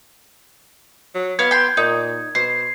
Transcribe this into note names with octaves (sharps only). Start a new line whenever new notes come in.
F#3
B3 C#5 F5 G#6
G5 C6
A#2 D#4
B2 C5 C7